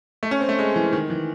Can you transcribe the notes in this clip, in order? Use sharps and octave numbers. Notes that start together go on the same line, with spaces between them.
A3
C#4
C4
A3
G#3
E3
D#3
E3